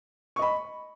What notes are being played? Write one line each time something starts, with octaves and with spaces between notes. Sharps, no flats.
D#5 B5 C#6